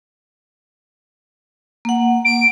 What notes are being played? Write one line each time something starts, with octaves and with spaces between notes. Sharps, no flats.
A#3 F#5
D7